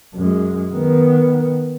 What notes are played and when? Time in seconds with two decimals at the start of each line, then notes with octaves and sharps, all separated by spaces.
0.15 F#2 G#3
0.72 D#3 B3